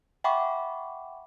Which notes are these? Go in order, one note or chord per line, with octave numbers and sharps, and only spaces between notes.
E5 F#5 G5 B5 C#6 D6